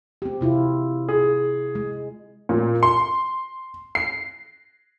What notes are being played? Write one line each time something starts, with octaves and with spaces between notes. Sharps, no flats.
C4 G4
C3 E4 F4
G#4
G#3
A#2
C6
C7